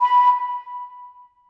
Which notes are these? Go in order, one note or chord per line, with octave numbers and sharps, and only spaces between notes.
B5